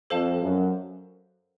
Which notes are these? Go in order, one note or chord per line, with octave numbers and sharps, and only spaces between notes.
F2 A4 C5 F5 A5
F#2